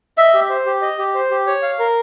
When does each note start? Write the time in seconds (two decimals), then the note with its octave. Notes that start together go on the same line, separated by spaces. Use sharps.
0.18 D#5 E5
0.34 G4
0.49 C5
0.66 G4
0.82 D#5
0.98 G4
1.14 C5
1.31 G4
1.47 C#5
1.63 F5
1.79 A#4